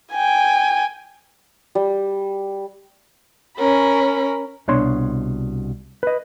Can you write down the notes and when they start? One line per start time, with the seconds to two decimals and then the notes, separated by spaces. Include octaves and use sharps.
0.13 G5 G#5
1.75 G3
3.57 C#4 A#4 B5
4.68 C2 B2 D4 C#5 C6
6.03 B4 D#5